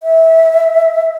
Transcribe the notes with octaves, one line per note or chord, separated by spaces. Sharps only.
E5